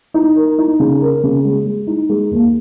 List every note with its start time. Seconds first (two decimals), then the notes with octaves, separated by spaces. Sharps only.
0.14 D#4
0.36 A#4
0.58 D#4
0.80 C#3
1.01 A#4
1.23 C#3
1.44 G#3
1.65 G#3
1.87 D#4
2.09 G#3
2.31 D#2